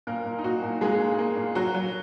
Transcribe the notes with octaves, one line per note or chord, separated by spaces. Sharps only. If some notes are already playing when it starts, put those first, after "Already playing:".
A#2 A#3 A#4
A#2
D#4
A#2 F#4
A#2
G#3 A#3 G#4
A#3
A#3
A#2
F#3 F#4
F#3